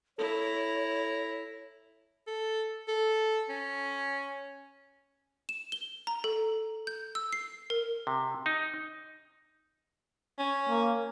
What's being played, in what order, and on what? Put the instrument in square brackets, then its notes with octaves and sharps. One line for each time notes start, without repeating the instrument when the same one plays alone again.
[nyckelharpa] E4 A#5 [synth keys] A4 [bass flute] C#5
[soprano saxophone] A4
A4
C#4
[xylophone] E7
G7
A#5
A4
G6
E6
C7
A#4
[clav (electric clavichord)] C3
D#4
[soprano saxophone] C#4
[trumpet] A#3